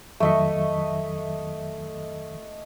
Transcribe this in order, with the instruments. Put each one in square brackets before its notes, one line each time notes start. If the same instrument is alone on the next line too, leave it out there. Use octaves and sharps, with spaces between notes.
[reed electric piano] F2 D#3 F#3 [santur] A3 D#5 E5